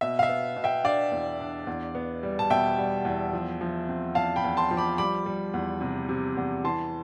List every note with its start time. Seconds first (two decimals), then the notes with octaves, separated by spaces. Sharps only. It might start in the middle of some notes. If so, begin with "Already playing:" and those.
0.01 B2 E5
0.19 F5
0.23 E5
0.29 B3
0.56 B2
0.64 E5 G5
0.84 D4 D5 F5
1.12 E2
1.40 D4
1.67 E2
1.95 B3
2.23 G3
2.39 A5
2.50 B2 E5 G5
2.78 G3
3.05 E2
3.33 F3
3.61 F3
3.89 C4
4.15 E2 F5 A5
4.36 G5 B5
4.44 E2
4.57 A5 C6
4.71 F3
4.77 B5 D6
4.98 G3 B5 D6
5.26 G3
5.54 E2
5.81 C3
6.09 C3
6.37 E2
6.64 E3 A5 C6